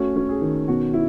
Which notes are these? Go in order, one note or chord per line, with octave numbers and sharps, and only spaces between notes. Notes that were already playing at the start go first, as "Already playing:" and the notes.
Already playing: A3 C#4 F#4
C#4
G#4
D#3
B2 F#4
E4